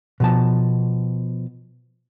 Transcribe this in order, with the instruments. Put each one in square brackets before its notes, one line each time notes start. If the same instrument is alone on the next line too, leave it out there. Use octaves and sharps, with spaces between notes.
[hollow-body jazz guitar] B2 F3 A5